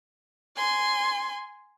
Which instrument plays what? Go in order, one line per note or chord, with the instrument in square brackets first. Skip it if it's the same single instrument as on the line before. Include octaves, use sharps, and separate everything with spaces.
[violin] G#5 C6